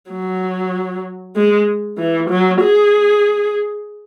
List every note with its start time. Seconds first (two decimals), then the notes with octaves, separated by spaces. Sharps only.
0.11 F#3
1.36 G#3
1.98 E3
2.30 F#3
2.61 G#4